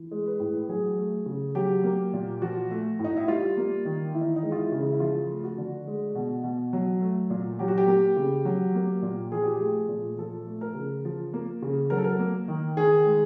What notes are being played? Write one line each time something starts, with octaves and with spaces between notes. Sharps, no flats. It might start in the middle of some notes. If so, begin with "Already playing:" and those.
Already playing: E3
G#3
B4
A2
F#3 G#4
A3
C#3
F#3 G4
A#3
A#2
F3 F#4
A3
A2
D#4
E4
G3 F4
A#3
D#3
E3 E4
D#4
D#4
G#3
F4
E4
C#3
D#4
E4
F3 F4
A3
F#4
D3
G#3
B2
B2
F#3
A3
A#2
F#3 G4
F#4
G4
A#3
C#3
F#3
A#3
A#2
F3 G#4
G4
A3 G#4
A#2
F3 A4
A3
A#4
C#3
F3
A#3
C#3
F#3 A#4
A4
A#4
A#3
D#3
D#3 G#4
G#3